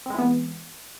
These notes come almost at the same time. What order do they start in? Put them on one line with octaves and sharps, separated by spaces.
C4 G#3 E3 B3